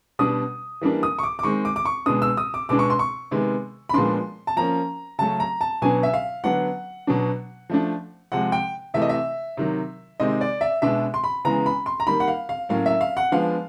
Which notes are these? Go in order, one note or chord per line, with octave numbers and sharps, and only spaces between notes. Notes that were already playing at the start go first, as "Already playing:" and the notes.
B2 G3 B3 D4 D#6
E3 G3 A#3 D4
D#6
C#6
D6
D6
D#3 G#3 C4 C#6
D6
D6
C#6
B2 G#3 B3 D4 D#6
E6
D#6
D6
B2 G#3 B3 D4 D6
C#6
C6
C#6
C3 D#3 G#3 B3
B5
A#2 F3 G#3 B3 D4 C6
A5
F3 A#3 C#4 A#5
C#3 F#3 A3 C#4 A5
A#5
A5
B2 F#3 B3 D4 G#5
E5
F5
D3 F#3 B3 D4 F#5
B2 F#3 B3 D4
F3 A3 D4
C3 F3 G#3 F#5
G5
C3 E3 A3 E5
D#5
E5
C3 D#3 F#3
C3 D#3 G#3 C4 D#5
D5
E5
B2 G#3 B3 D4 E5
C6
B5
C#3 E3 G#3 B3 A#5
B5
C6
A#5
D#3 G3 A#3 B5
F#5
F5
F5
A2 F#3 A#3 C#4 F5
E5
F5
F#5
F3 G#3 B3 D4 F5